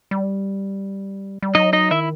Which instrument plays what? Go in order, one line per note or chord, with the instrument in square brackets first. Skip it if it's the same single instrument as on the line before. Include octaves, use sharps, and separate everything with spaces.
[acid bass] G3
G3
[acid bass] F#3 [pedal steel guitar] D#4 D#5
[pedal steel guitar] D#4 D#5
[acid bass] D#3 [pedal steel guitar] E4 E5